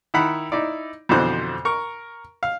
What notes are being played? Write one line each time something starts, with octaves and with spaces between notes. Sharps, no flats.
D#3 E4 F#5 B5
D#4 E4 D5
F2 B2 D3 E3 C5 F#6
A#4 C#6
F5